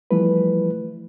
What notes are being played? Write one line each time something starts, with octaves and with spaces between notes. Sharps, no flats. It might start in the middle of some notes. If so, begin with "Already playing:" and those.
E3 F3 G3 A3 E4 B4